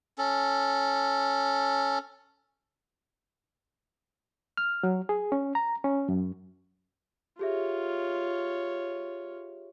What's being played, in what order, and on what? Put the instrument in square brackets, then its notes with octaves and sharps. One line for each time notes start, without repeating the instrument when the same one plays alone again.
[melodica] C#4 A4
[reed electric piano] F6
F#3
G#4
C#4
A#5
C#4
F#2
[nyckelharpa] F4 C#5 [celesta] G4 G#4 E5